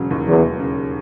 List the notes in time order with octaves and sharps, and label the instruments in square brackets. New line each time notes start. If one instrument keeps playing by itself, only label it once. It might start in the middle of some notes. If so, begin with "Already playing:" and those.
Already playing: [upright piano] E1 C#3 F#3
D#2
[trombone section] E2 [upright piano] F#3
[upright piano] E1
C#3